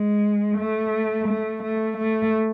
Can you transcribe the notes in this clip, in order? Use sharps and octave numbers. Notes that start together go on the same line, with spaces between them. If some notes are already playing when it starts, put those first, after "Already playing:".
Already playing: G#3
A3
A3
A3
A3